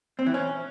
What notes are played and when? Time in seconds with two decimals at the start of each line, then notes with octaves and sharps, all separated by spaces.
0.19 C4
0.26 E3
0.34 C#4